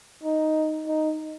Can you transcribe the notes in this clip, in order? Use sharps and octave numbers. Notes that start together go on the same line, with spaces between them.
D#4
D#4